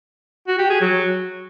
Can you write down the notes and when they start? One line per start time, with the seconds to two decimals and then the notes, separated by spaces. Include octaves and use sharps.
0.47 F#4
0.59 G4
0.70 G#4
0.81 F#3